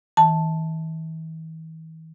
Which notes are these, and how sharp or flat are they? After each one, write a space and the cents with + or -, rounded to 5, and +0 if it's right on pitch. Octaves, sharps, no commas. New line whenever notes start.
E3 -45 A5 +0